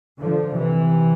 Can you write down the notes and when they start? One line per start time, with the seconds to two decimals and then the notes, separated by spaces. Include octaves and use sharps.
0.22 D3 F3
0.57 C3 E3